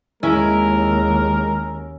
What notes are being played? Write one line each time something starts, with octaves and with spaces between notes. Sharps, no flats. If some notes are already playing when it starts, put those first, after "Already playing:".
D#2 G#3 C#4 E4 A#4